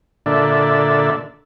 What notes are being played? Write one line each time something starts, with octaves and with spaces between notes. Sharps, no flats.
A#2 D3 D4 A4 E5